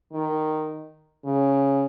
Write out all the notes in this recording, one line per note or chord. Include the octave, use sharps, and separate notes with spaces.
D#3
C#3